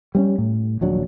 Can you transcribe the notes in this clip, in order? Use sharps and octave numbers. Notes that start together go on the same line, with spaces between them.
G3 C4 C#4
A2
D#1 A#1 F#3 D4